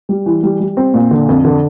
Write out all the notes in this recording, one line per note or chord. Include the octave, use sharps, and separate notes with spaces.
G3
E3
G3
G3
C4
A#2
D3
F2
D3